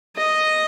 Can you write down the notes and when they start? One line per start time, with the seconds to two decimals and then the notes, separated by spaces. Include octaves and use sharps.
0.17 D#5